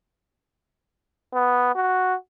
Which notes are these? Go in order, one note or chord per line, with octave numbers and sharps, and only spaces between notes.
B3
F#4